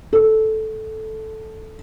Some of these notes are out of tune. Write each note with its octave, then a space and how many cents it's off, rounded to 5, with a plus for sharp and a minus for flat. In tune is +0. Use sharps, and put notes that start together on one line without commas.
A4 -5